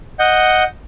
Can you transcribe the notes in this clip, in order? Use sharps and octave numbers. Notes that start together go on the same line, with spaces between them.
D#5 F#5 G6